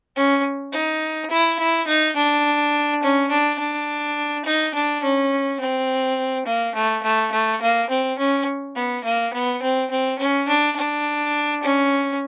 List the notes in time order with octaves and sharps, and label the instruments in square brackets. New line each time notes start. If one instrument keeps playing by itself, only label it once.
[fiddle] C#4
D#4
E4
E4
D#4
D4
C#4
D4
D4
D#4
D4
C#4
C4
A#3
A3
A3
A3
A#3
C4
C#4
B3
A#3
B3
C4
C4
C#4
D4
D4
C#4